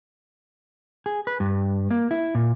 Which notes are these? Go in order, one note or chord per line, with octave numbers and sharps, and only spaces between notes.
G#4
B4
G2
A#3
E4
A#2